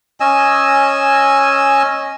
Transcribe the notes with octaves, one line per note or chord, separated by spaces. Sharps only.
C#4 D#5 G#5 E6